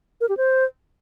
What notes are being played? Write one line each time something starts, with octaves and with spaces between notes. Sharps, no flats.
A#4
G4
C5